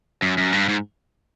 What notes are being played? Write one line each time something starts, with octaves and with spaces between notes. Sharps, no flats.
F#2
F#2
G2
G#2